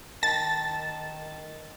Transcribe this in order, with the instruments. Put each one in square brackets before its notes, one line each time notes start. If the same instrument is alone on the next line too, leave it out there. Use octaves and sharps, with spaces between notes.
[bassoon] D#3 [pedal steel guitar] A5 [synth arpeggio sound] A6